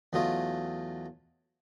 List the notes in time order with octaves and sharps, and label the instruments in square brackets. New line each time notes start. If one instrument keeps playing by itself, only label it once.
[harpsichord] E2 F#3 A3 F4 D#5